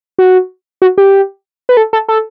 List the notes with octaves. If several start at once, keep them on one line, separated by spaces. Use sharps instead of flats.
F#4
F#4
G4
B4
A4
A4
A4